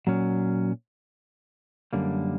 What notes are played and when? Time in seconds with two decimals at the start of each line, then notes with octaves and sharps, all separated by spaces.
0.07 A#2 F#3 C#4
1.93 F#2 D3 G3 A#3